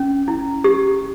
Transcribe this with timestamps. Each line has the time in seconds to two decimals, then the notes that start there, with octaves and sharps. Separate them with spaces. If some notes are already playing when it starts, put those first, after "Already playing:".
Already playing: C#4
0.28 E4
0.64 G4